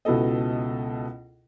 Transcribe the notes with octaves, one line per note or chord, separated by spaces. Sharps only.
C#2 B2 E4 A4 D#5